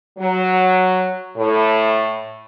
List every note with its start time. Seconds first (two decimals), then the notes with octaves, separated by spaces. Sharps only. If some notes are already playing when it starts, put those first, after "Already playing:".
0.19 F#3
1.37 A2